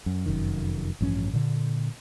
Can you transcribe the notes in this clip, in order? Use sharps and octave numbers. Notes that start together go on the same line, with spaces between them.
F#2
F1 F#2 D#3
A1 G2 F3 C#4
A#2 D3